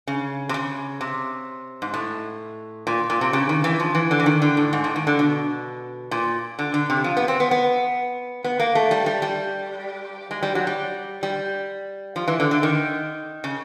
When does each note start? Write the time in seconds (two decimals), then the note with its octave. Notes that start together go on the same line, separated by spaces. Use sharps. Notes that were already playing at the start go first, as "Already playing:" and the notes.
0.07 C#3
0.49 C3
0.54 C#3
1.01 C3
1.82 G#2
1.94 A2
2.87 A#2
3.10 A#2
3.21 C3
3.33 C#3
3.49 D#3
3.64 E3
3.80 F3
3.95 E3
4.11 D3
4.20 E3
4.26 D#3
4.42 D3
4.57 A2
4.73 G#2
4.84 A2
4.96 D#3
5.07 D3
5.19 B2
6.11 A#2
6.59 D3
6.74 D3
6.90 C3
7.04 F3
7.17 B3
7.28 C4
7.40 B3
7.51 B3
8.44 B3
8.59 A#3
8.75 A3
8.91 G3
9.06 G3
9.22 G3
10.31 G#3
10.43 G3
10.55 F#3
10.67 G3
11.23 G3
12.16 F3
12.28 E3
12.40 D3
12.51 D3
12.63 D#3
13.44 C#3